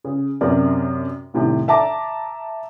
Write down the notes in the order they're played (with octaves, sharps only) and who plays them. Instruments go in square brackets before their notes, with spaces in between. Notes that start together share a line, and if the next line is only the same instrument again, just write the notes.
[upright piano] C#3
F#2 C3 A#4 D5
C2 A2 C3 D#3
E5 A5 A#5 D6